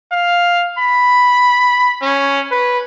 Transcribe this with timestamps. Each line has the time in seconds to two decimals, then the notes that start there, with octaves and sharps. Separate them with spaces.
0.12 F5
0.78 B5
2.02 C#4
2.52 B4